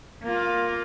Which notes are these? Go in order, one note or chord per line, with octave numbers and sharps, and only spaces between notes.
A#3 F4